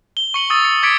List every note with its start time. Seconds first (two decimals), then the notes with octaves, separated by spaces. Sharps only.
0.17 G7
0.34 C#6 C#7 F#7 G7
0.50 C#6 D#6 E6 A6
0.65 C#7
0.83 D6 G#6 B6 C#7 D7